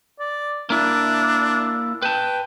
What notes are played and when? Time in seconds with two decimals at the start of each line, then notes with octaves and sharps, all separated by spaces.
0.19 D5
0.70 A#3 D4 E4
2.02 B4 G5 A5